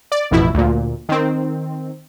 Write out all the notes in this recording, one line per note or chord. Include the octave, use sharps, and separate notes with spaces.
D5
A1 F2 B2 E4
D2 A#2
D#3 C4